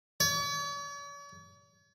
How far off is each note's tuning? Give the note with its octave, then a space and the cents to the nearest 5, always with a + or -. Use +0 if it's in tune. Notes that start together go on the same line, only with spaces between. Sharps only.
C#5 +45